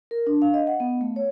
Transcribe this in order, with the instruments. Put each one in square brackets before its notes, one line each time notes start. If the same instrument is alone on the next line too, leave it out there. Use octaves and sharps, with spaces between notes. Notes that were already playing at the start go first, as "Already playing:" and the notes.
[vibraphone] A#4
D4
F5
D#5
F#5
B3
A3
C#5